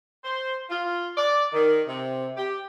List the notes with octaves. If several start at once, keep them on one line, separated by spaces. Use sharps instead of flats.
C5
F4
D5
D#3
C3
G4